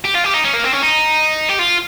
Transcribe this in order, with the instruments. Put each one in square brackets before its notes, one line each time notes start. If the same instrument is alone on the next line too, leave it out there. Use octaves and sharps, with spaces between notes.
[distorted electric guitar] G4
F4
G4
D#4
C#4
A#3
C4
C#4
D#4
G4
F4